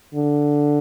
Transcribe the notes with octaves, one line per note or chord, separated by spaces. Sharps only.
D3